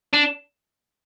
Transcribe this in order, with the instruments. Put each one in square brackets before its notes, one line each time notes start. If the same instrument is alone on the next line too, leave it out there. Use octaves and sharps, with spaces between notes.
[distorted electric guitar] D4